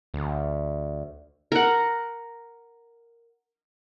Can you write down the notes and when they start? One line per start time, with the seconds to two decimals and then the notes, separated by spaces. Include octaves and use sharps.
0.14 D2
1.52 A#4 F#5